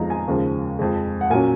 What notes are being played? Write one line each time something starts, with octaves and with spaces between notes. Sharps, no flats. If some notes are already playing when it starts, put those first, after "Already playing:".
Already playing: F2 F3 G#3 B3 D#4 F5 A#5
G#5
D#2 C#3 F3 G#3
F2 F3 G#3
F#5
A#2 F#3 C#4 G#5